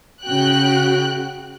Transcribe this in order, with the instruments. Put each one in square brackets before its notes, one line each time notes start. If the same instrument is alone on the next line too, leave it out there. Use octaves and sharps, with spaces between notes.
[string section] C#3 F#4 G5 F#6